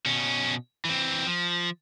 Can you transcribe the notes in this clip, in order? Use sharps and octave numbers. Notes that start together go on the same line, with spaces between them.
B2 C#4
E3 C4
F3